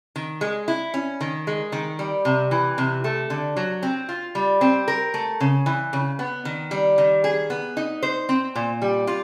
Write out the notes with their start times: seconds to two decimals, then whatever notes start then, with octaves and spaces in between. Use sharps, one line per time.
0.16 D#3
0.41 G#3
0.68 E4
0.94 C#4
1.21 D#3
1.47 G#3
1.72 D#3
1.99 G3
2.25 C3
2.51 E3
2.78 C3
3.04 A3
3.30 D3
3.56 F#3
3.83 C4
4.09 F4
4.35 G3
4.61 C4
4.88 A#4
5.14 A3
5.40 C#3
5.66 E3
5.93 C#3
6.19 B3
6.45 D#3
6.71 G3
6.98 D#3
7.24 G#4
7.50 B3
7.77 D#4
8.03 C5
8.29 C4
8.55 A#2
8.82 G3
9.07 F4